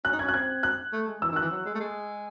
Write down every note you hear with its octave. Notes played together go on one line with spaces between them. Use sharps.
C#4 F#6
D#4
C#4 G#6
F#6
C4 G#6
F#6
A3
G#3
E3 E6
D#3
F#6
E3
F#3
G#3
A3
G#3